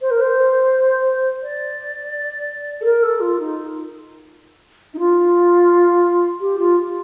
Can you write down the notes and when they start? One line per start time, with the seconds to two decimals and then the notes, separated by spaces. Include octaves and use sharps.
0.01 C5
0.10 A#4
0.21 C5
1.42 D5
2.81 A4
2.84 A#4
3.03 A4
3.20 F4
3.39 D#4
4.93 D#4
4.98 F4
6.40 G4
6.58 F4